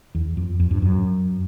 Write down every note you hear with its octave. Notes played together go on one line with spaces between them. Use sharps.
E2
F2
F2
G2
F#2